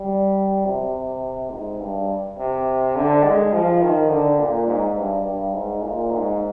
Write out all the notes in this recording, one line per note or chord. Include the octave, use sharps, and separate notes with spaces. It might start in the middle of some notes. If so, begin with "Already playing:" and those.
Already playing: G3
C3
G#2
G2
C3
D3
G#3
F3
D#3
D3
A#2
G#2
G2
G2
G#2
A#2
G#2